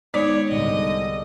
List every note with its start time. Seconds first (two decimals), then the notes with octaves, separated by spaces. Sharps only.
0.14 G#3 B3 D#4 C#5 D5
0.49 C2 G#2 D3 D#5